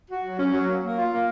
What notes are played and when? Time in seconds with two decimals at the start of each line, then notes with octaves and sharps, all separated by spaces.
0.09 F#4
0.24 F#3
0.38 C#4
0.53 F#3
0.68 A#3
0.82 A#3
0.97 F4
1.11 A#3